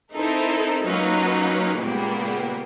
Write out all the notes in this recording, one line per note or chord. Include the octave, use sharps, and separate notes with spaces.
C4 D#4 E4 A4 A#4 C5
F#3 A#3 C#4 D#4 F4 B4
A#2 C#3 G3 G#3 A#3 B3